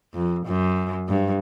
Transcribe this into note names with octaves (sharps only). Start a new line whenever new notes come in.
F2
F#2
G2